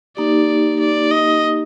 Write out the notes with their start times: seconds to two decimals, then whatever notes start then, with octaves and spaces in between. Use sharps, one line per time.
0.17 A#3 D#4 G4 D5
0.80 D5
1.11 D#5